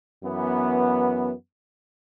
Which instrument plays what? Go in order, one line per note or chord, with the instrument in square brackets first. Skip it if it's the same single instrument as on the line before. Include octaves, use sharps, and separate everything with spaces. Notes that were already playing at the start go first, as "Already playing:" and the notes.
[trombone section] F#2 E3 B3